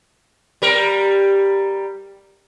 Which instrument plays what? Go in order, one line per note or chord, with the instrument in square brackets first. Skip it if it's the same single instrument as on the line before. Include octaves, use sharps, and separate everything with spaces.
[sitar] G3 A#4